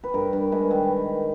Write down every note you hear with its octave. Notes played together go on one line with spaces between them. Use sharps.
B4
G2 A#4
G2
G#3 B4
D#3